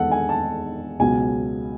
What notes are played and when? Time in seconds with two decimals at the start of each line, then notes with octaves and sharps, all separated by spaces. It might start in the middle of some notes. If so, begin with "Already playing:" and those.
Already playing: E2 D#3 G#3 B3 A4 F#5
0.11 G#5
0.29 A5
0.99 C#2 B2 F#3 B3 G#5